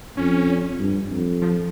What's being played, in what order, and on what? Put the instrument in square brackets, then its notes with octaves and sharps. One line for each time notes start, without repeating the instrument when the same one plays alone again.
[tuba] F2 [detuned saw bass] C#4
[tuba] G2
F2
[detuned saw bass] F3